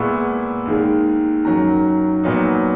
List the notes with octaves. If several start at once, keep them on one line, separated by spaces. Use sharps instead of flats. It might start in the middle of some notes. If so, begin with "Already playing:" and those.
Already playing: A#2 G#3 B3 E4 C#6
D#2 D#3 G#3
F#2 D#3 F#3 A#5
A#2 F#3 B3 D#4